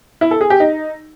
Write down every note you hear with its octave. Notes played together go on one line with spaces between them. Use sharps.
E4
A4
G#4
G4
D#4